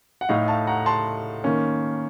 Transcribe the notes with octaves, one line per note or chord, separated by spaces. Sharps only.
F#5
A2 A3 D#4 F5
F5 A5
F#5 A#5
A5 C6
D#3 A#3 C#4